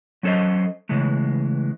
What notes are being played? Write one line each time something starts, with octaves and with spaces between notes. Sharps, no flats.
F#3 C#4 A4 C5 D#5
C#3 E3 G#3 A3